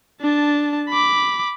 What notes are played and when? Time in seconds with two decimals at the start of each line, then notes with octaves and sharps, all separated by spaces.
0.21 D4 A5
0.89 B5 D6